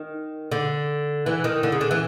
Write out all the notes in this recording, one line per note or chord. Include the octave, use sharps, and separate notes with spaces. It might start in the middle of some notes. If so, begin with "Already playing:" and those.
Already playing: D#3
D3
E3
D#3
D3
C#3
D3
E3